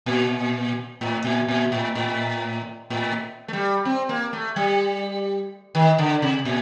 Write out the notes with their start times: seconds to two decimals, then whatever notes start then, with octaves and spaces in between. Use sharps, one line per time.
0.06 A#2
1.01 A2
1.24 A#2
1.48 A#2
1.72 A2
1.95 A2
2.90 A2
3.48 A3
3.53 G3
3.85 C4
4.09 A#3
4.33 A3
4.56 G3
5.75 D#3
5.98 D3
6.22 C3
6.45 A#2